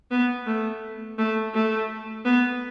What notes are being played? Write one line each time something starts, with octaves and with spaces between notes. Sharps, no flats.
B3
A3
A3
A3
B3